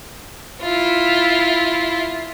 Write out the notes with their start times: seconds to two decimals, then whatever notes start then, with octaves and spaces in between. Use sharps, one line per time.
0.62 E4 F4